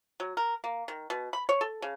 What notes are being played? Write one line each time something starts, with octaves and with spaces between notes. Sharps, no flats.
F#3
A#4
A#3
D#3
B2
B5
C#5
A4
C#3